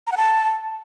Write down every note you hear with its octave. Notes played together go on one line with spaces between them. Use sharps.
A#5
F#5
A5